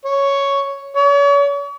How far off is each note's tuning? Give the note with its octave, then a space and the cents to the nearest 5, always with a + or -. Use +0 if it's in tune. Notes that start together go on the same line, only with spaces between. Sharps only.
C#5 +5
C#5 +40